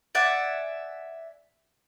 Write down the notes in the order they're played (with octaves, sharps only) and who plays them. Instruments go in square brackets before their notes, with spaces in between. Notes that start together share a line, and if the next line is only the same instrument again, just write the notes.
[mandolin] D5 E5 F#5 G#5